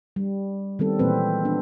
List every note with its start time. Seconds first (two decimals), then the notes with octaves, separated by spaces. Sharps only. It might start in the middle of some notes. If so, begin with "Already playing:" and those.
0.16 G3
0.79 D#3 G3 B3 C4 A4
0.99 A#2 E3 G#3 A#3 C4 B4
1.45 B3 D4